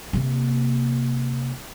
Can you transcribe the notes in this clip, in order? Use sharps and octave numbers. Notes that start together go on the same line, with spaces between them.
C3 A#3